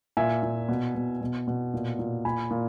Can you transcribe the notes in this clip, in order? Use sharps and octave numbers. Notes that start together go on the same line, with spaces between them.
A#2 E5 G#5
A#2
B2
B2
B2
B2
A#2
A#2
A#2 G#5 B5
A#2